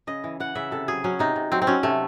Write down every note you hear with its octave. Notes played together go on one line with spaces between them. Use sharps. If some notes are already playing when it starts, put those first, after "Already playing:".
C#3 D#5
E3
E3 F#5
C#3 E5
C3 A4
F#3 G#4
F#3 C#4
C3 D#4
C3
F#3 C4
C4
F#3 C#4
C3 A3